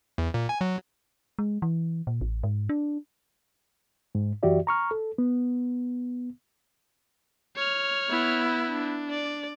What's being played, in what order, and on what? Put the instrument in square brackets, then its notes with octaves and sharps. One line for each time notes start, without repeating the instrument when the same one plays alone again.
[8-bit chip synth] E2
A#2
G#5
F#3
[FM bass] G#3
E3
A#2
A1
G#2
D4
[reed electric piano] G#2
F#2 E3 F#4 G4 D5 E5
A#5 C#6 F6
A4
B3
[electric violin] C#5 F6
[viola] B3 E4
[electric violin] D4
[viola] D5